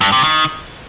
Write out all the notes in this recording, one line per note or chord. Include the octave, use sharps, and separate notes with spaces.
G2
C3
D#3